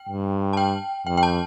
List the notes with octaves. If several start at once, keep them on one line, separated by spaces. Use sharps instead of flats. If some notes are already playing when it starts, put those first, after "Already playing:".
Already playing: G5
G2
A5
G5
F2 G5
G5
A5